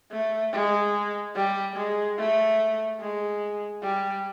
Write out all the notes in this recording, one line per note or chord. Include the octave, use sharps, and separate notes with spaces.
A3
G#3
G3
G#3
A3
G#3
G3